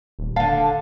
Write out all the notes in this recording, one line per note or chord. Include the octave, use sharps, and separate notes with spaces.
D#1
D3 F5 A5